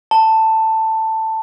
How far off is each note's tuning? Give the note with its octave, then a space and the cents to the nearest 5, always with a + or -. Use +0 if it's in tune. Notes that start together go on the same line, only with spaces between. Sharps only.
A5 +10